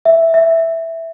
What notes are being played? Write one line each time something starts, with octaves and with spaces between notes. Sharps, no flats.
E5
E5